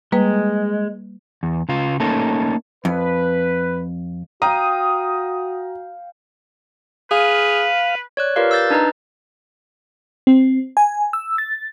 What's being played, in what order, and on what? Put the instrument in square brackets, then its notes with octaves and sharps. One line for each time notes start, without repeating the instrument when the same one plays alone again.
[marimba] G3 A#3 B4 [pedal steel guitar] G#3
[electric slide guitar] E2
C#3 F4
A3 A#3 C#4 D#4 A4
[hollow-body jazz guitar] F2 [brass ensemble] B4
[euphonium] F#4 [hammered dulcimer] F5 G5 [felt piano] A#5 [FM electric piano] D#6
[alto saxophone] G#4 [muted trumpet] B4 [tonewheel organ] F5
[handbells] C#5 D5 F#6
F4 G4 A#4 B4 D5 F5
E6 F#6 G6 A6
D4 D#4 B4 D#5 A#5
[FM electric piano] C4
G#5
E6
A6